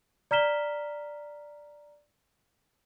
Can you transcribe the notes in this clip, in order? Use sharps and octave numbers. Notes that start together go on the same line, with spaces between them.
D5 A#5 F6 B6 E7 G7